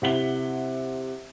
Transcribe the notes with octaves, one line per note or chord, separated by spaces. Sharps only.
C3 E4 F#5 B6 F#7 G7